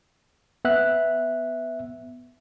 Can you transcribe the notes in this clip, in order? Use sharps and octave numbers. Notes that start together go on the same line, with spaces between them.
B3 E5 F#6